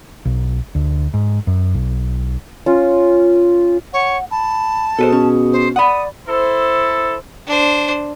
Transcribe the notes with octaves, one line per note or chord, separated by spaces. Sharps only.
B1
D2
G#2
F#2
B1
C#4 F4
C#5 F#5
A5 B5
B2 G#4 A4 B4 C5
C#4
C5
D5 F#5 B5 D#6
E4 A4 C5
D4 C5